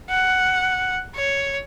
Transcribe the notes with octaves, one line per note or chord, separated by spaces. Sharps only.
F#5
C#5